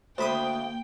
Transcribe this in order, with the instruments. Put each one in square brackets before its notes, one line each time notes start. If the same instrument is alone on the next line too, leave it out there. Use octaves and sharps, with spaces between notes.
[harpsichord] D2 [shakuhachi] A#3 [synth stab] C5 B5 D#6 [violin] G5